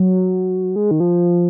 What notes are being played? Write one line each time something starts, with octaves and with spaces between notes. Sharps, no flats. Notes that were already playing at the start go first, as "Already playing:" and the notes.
Already playing: F#3
G#3
D#3
F3